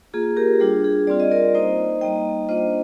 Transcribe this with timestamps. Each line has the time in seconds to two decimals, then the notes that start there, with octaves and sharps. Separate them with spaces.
0.14 A#3 F4 G#4
0.37 G4 A#4
0.60 G3 D4 F4 G#4
0.84 G#4
1.07 G3 C4 F4 D5
1.20 D#5
1.31 A#4 D5
1.55 A#3 D#4 C5 D#5
2.01 G3 A#3 D#4 D#5 G5
2.49 A#3 D4 F4 C5 D#5